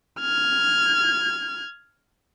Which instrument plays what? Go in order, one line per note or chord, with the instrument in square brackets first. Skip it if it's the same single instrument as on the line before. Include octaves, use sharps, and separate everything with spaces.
[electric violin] F6 G#6